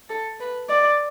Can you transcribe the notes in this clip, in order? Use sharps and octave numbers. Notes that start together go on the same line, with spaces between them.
A4
B4
D5